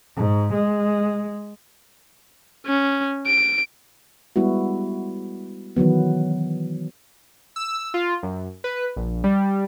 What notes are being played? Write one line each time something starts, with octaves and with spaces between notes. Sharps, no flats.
G#2
G#3
C#4
D7
G3 G#3 B3 E4 F#4
D#3 E3 F#3 B3
E6
F4
F#2
B4
A#1
G3